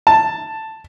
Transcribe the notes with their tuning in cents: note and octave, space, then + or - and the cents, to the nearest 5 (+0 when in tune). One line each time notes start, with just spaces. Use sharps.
A5 +5